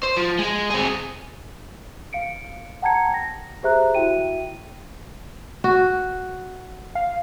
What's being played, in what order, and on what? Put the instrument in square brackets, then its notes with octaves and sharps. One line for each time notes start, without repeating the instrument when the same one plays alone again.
[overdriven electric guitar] C5
F3
G#3
C4 G#4
[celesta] F5 C#7 D7
F#5 G5 A5 A#5 G#6 C#7
A#6
G4 G#4 C5 E5 A#5 F#6
E4 F#4 E5 G5 D#7
[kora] F#4
[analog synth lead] F5